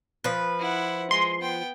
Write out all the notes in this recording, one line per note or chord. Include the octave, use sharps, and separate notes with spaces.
F3 B4
E4 F#5
G#3 C6
B3 G5